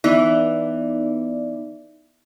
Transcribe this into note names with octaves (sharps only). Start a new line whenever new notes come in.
E3 B3 D#4 D5